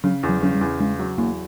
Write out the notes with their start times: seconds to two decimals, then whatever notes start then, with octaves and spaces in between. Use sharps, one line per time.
0.04 C#3 F#3
0.23 E2
0.29 F#3
0.42 C#3 F#3
0.55 G3
0.61 E2
0.80 C#3 G#3
0.99 F#3
1.18 E2 A#3